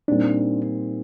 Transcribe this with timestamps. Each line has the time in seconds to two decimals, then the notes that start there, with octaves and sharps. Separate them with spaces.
0.08 A#2 G3 C4 D4 D#4